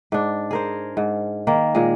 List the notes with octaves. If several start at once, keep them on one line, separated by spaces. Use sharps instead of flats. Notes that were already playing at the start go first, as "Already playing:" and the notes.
G#2 D4
G#4 A#4 C5
G#2
D#3 A#3
A#2 G#3